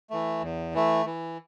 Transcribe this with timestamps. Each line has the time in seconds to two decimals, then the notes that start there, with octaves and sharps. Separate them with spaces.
0.10 E3 A3
0.42 E2
0.74 E3 A3
1.06 E3